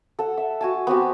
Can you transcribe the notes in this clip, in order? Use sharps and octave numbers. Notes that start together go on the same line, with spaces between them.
A4 F#5
E5
F#4 G#5 A5
B3 C4 F#4 G4